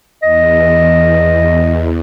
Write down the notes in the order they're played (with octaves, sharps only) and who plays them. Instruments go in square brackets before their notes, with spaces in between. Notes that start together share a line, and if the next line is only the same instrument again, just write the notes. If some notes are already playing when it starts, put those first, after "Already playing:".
[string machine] E2 [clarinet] D#5